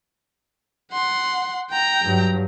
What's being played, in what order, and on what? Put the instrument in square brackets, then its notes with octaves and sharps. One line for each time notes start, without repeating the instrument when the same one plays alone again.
[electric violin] F#5 C6
G5 A#5
[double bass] G2 F#3